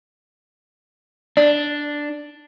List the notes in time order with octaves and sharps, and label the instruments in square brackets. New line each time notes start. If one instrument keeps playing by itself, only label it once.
[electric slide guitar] D4 [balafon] D5